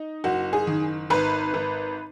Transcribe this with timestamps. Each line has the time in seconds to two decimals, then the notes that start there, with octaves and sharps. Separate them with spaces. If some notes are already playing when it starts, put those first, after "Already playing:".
Already playing: D#4
0.24 F#1 F#4
0.53 G#4
0.67 D#3
1.10 G#1 B4
1.54 G#1